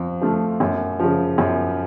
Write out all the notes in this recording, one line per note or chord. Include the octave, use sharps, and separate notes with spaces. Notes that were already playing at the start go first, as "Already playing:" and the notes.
Already playing: F2
F3 A3 F4
F#2
C#3 F3
F#2